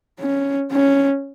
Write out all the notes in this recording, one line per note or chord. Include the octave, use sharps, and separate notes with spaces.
C#4
C#4